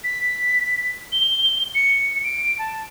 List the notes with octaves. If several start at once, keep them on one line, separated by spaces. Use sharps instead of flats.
B6
G7
C#7
D7
A5